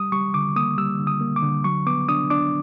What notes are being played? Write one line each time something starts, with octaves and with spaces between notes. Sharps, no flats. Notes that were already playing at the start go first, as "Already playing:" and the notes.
Already playing: G3 D#6
G3 C#6
D3 D6
A#3 D#6
G3 E6
D3
D#6
A#3
D6
D3
F#3 C#6
B3 D6
D4 D#6
D4 D6